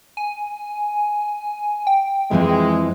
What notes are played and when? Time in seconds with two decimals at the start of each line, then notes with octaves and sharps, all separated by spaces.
0.17 G#5
1.87 G5
2.31 F2 E3 G#3 C4